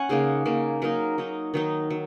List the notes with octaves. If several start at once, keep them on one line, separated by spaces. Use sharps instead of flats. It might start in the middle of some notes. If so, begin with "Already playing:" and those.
Already playing: C#4 F#5 G#5
C#3 A#3 D#4 G#4
C#3 A#3 D#4
F#3 A#3 D#4 A#4
F#3 D#4
D#3 F#3 D#4
F#3